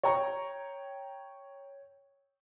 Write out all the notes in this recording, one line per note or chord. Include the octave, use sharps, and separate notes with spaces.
C#5 G5 A#5 C#6